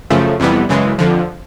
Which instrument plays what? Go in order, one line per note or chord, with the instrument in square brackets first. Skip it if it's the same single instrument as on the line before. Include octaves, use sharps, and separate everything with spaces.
[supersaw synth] F#2 C#3 F3 A3
F2 C3 E3 G3 B3
F#2 C#3 E3 G#3
F2 D3 F3